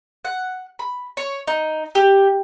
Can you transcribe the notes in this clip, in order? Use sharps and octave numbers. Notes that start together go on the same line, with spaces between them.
F#5
B5
C#5
D#4
G4